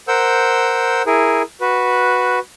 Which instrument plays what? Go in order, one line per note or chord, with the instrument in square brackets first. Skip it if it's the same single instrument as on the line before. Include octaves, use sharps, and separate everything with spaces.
[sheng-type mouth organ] A#4 C5 F#5 E6 G6
E4 G#4 A#4
F#4 B4